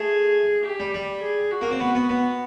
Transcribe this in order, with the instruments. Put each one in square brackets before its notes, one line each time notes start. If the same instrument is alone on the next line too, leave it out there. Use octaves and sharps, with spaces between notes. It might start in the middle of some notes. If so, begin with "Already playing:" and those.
Already playing: [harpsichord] A3 [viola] G#4
[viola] G4
[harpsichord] G3
G3
[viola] G#4
F#4
[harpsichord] A#3
C4
B3
B3
B3